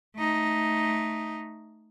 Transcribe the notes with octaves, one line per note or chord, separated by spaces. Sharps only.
A3 D#4